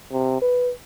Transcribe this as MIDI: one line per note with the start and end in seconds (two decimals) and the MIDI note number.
0.12 0.41 48
0.42 0.71 71